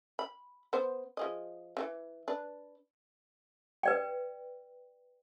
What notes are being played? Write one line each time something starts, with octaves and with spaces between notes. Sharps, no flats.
B5
B3 C5
F3 G#4 D#5
C#3 E3
D4 B4
B4 D5 G5